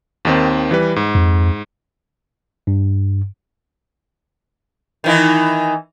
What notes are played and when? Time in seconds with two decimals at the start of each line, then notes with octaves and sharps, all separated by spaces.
0.25 D#2 D#3 C4
0.71 E3 G3 B4
0.96 G#2
1.15 F2
2.67 G2
5.04 D#3 E3 D#4